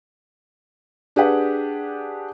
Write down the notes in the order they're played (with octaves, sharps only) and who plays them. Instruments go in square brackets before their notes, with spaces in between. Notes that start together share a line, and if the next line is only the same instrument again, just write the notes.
[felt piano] D4 G4 G#4 B4 F#5